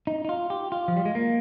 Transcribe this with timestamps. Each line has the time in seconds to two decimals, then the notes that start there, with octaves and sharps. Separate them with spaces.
0.07 D#4
0.25 D#4
0.29 F4
0.50 G4
0.72 F4
0.88 F3
0.96 G3
1.05 G#3
1.15 A#3